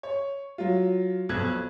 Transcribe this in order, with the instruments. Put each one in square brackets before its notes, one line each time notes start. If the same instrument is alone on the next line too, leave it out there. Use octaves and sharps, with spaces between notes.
[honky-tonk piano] C#5
F#3 F4
B1 F2 F#6 G#6